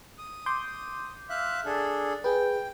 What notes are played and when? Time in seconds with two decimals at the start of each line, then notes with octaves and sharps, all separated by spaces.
0.18 D#6
0.46 C6 D6 G6
1.30 E5 F5 F#6
1.65 D4 G#4 A4
2.24 G#4 B4 G5